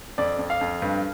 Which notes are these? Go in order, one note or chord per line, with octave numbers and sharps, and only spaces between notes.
F2 D5
F2
F5
F2
G2